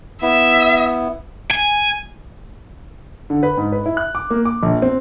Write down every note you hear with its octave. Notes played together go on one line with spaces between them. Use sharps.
B3 E4 E5
G#5
D3
B4
G#2
B4
E4
F#6
D6
A#3
D6
A#1
C4